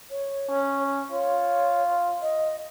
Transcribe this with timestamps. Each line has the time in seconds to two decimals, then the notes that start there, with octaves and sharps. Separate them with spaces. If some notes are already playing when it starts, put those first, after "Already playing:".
0.11 C#5
0.49 C#4
1.11 F4 C#5
2.22 D#5